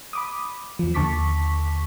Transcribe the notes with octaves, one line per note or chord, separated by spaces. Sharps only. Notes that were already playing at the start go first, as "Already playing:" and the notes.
B5 D6 D#6
E2 F3
D#2 D3 A5 C#6 D6 B6